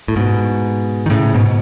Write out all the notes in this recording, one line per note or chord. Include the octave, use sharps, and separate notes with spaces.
A2
G#2 B2
D#3
A2 C#3
G#2 B2